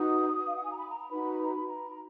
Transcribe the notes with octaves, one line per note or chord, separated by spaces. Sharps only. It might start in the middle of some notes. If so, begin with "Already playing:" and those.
Already playing: D#4 F#4 B4 D#6
F5
F#5
G#5
A#5
B5
A#5
A#5
D#4 F#4 B4 B5
A#5
B5
A#5